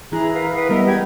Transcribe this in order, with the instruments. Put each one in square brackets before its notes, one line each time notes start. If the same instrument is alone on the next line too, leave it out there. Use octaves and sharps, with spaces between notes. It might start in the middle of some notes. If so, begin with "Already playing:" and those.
[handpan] E3 E4 [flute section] G#4 A#5 F#6
[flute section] A#4 B4 F5
B4 F#5 D#6
[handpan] G3 G#3 B3 [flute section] A#4 D#5 E5
[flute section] G4 B4 G#6